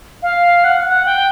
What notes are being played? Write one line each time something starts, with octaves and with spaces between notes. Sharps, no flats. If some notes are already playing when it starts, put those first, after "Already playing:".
F5
F#5
F#5
G5